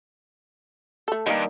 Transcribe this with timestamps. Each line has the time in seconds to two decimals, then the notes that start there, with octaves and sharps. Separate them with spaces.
1.08 A3 A4
1.27 G2 D#3 A#3